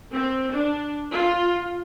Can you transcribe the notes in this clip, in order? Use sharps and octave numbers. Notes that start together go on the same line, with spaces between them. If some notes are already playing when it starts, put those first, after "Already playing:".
C4
D4
F4